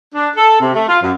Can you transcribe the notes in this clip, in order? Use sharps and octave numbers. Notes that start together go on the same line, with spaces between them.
D4
A4
C3
A3
F4
F#2